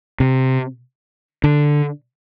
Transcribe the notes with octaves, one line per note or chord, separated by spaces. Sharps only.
C3
D3